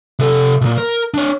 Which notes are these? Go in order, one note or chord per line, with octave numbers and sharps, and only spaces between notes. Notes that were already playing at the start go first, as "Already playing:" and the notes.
C3 A4
B1 A#2
A#4
D4 C#5